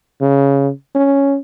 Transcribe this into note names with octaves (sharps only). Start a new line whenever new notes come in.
C#3
C#4